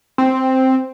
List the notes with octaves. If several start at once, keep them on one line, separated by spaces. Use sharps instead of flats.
C4